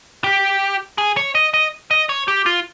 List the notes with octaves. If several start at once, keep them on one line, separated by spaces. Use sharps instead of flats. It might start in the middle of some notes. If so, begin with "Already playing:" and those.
G4
G#4
C#5
D#5
D#5
D#5
C#5
G4
F4